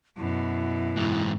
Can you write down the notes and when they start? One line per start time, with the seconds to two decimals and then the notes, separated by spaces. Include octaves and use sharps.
0.17 F#2 B2 E4
0.96 G#2 E3